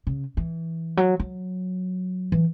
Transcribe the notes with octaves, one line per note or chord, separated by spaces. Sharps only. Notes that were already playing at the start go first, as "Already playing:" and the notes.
C#3
E3
F#3
F#3
E3